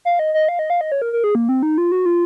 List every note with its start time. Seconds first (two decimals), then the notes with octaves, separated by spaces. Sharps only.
0.05 F5
0.19 D#5
0.34 D#5
0.49 F5
0.59 D#5
0.70 F5
0.81 D#5
0.92 C#5
1.02 A#4
1.13 A#4
1.24 G#4
1.35 A#3
1.49 C4
1.63 D#4
1.78 F4
1.92 F#4
2.06 F4